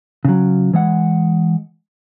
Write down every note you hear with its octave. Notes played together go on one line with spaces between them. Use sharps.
C#3 F#3
E3 G#3 F#5